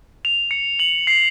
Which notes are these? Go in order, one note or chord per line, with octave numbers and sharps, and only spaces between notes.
F7
C#7
F#7
C7